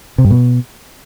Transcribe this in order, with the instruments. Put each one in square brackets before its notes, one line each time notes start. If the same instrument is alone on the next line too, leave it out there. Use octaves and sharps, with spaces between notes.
[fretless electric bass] C3
G2
B2